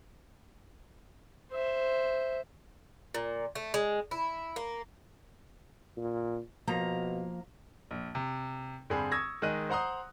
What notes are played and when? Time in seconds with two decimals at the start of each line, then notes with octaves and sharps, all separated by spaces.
1.52 C5 E5
3.14 A#2
3.55 A3
3.74 G#3
4.11 E4
4.56 A#3
5.96 A#2
6.67 B2 F3 A#3 A#5
7.91 A#1
8.15 C3
8.90 G2 D3 C4 G#4 B5
9.12 C#6 D#6 E6 G#6 A#6
9.42 D#3 G#3 G#4 D#5 F#6 D#7
9.69 C5 F#5 A#5 C6 D#6